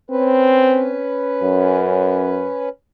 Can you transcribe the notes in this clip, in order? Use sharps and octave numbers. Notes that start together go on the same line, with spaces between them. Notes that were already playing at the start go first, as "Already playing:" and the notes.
C4 C#4 B4
F#2